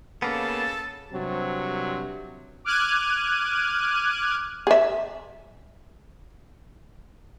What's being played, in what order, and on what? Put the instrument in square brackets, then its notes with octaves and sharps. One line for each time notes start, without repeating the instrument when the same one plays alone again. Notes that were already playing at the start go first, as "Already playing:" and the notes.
[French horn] C#3 [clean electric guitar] A#3 B3 [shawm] A4 [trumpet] A5
[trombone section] G2 C3 F#3 C4
[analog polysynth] D6 F6 F#6 G#6 D#7
[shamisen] G#4 E5